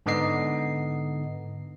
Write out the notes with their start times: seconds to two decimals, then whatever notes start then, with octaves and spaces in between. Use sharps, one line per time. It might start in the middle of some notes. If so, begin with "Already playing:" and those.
0.06 G#2 D3 B3 D#4 D#5 C7